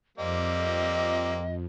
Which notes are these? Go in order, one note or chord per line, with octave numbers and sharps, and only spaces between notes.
F2 G3 A#3 C4 D#5